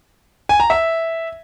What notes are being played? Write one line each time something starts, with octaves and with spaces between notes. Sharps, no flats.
G#5
A#5
E5